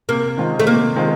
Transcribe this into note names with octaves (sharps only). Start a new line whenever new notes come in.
C3 A#3
D#3 G#3 C4 F4
A3
C3 A#3
D#3 G#3 C4 F4